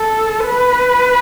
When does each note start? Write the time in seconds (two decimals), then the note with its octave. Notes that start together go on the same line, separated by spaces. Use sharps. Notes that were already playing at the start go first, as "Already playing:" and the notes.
Already playing: A4
0.46 B4